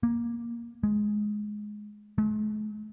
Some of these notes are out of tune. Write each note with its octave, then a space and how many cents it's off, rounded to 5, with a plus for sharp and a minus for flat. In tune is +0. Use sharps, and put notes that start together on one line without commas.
A#3 +10
G#3 +10
G#3 +45